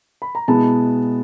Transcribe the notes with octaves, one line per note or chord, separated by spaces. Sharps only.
B5
A#5
B2 G#3 B3 E4 A5